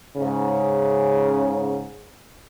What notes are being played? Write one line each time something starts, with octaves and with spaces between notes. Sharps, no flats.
G#2 C#3